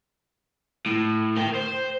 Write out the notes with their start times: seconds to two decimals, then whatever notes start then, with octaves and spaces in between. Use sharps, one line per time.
0.86 A2
1.37 A#4 G5
1.55 C5